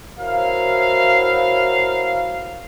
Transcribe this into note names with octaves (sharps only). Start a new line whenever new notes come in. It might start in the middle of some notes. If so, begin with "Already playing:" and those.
E4 F#4 A#4 C5 C#5 F5